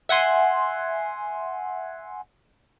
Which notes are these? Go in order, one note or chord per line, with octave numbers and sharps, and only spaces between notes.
E5 F#5 G#5 C6